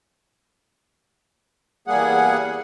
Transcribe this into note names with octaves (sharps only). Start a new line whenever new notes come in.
E2 G3 A#3 G#4 F#5